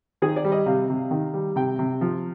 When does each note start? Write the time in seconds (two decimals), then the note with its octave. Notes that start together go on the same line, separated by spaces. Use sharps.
0.22 D#3 G#4
0.36 D5
0.45 G3
0.52 D#5
0.66 C3 F5
0.90 C3
1.11 D#3
1.34 G3
1.56 C3 G5
1.79 C3
2.01 F3